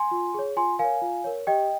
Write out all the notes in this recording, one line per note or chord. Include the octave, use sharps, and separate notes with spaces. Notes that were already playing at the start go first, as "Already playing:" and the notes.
Already playing: G#5 C6
F4
G#4 C#5
F4 G#5 C6
A#4 C#5 F5 G#5
F4
A#4 C#5
G4 D#5 G5